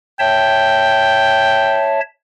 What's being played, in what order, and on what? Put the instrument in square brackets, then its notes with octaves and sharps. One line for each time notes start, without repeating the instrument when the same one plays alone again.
[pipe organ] C#5 E5 A5 [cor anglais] G5